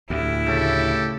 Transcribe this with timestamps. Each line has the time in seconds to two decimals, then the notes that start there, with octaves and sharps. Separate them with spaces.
0.10 D2 A2 E4 G4
0.46 C#3 A3 G4 A4